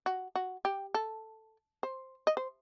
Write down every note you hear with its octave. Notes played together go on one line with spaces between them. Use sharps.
F#4
F#4
G4
A4
C5
D#5
C5